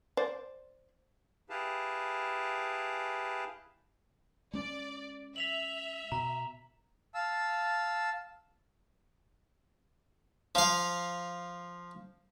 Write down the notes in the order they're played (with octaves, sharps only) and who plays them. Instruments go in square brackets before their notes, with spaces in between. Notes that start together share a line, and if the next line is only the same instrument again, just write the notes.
[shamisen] C5 D5
[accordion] E4 G4 G#4 B4 F5 A5
[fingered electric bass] G#3 C#4 [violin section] D5
[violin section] E5 [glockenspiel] B6 F7 F#7
[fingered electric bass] B2 [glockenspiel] A#5
[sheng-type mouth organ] F5 A5 E6
[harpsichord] F3 F5